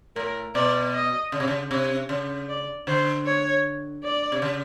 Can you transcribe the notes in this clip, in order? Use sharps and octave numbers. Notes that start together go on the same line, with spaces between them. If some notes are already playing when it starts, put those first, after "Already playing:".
A2 A#4
B2 D5
D#5
C#3
C3
C#3
C3
C#3
D5
D3 C5
C#5
D5
C3
C#3